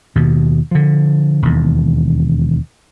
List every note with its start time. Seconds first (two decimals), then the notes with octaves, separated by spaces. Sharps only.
0.15 D#2 B2
0.71 D3 F3
1.42 E1 D#2